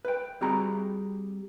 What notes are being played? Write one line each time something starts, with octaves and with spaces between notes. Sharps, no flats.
B4 G5
G3 C4 F#4 G#4 A#5 B5